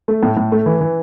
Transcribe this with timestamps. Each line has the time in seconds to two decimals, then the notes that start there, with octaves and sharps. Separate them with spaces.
0.08 A3
0.23 A2
0.37 A2
0.52 A3
0.66 E3
0.81 E3